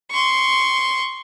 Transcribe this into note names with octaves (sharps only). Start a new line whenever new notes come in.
C6 C#6